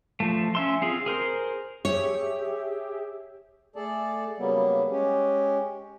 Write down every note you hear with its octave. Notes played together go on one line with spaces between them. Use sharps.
F3 A3
C#4 E5 C6
C4 F4 G#4
G#4 A#4 C5
G4 G#4 C#5 E5
A3 G#4 A4 D5 A5
C#3 F#3 G3 A#3 B3
G#3 C#4 G4